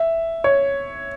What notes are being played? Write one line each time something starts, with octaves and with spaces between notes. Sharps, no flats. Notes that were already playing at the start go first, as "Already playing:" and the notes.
Already playing: E5
C#5